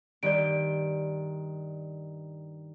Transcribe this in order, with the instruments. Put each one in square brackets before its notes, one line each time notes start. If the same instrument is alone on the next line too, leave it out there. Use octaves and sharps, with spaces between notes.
[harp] G2 D#3 [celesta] D5 D7